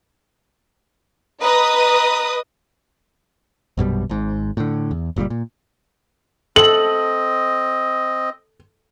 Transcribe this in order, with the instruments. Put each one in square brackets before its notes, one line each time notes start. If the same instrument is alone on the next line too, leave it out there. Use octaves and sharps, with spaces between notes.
[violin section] B4 D#5 D#6 [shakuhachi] A#5
[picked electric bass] A#1 F#2 B2 G3
G#1 G#2
A2 D3
E2
F#1 A#2 C#3 G3
A#2
[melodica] C4 D#5 [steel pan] A4 [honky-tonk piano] F#7